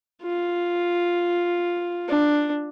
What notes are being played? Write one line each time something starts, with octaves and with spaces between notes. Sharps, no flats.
F4
D4